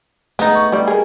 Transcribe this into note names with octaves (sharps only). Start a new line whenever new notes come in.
G#3 A3 B3 D#4
C#6
G3 G4 D5
G#4 A#4